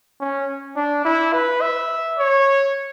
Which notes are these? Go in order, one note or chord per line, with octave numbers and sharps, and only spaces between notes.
C#4
D4
E4
B4
E5
C#5